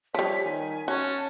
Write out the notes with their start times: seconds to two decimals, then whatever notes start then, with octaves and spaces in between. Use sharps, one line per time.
0.14 F3 G3 C#5 B6
0.44 D#3 G#5
0.88 C#4 F#4 C#5 A5